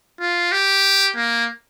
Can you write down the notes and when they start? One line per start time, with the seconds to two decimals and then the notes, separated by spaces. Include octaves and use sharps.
0.21 F4
0.52 G4
1.17 A#3